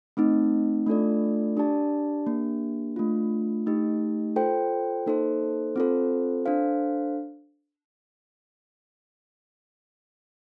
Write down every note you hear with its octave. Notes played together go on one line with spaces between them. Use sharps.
A3 C4 D#4
A3 D4 F4 A4 D5
D4 G4 D5 A5
A#3 D4 G4
A3 D4 F4
A3 D#4 G4
F4 A4 C5 G5
A#3 D#4 A4 C5
C4 F4 A4 C5
D4 A4 C5 F5